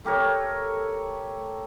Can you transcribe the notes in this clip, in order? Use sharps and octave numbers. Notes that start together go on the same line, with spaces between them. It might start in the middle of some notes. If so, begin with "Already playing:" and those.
A3 G4 A#4 C#5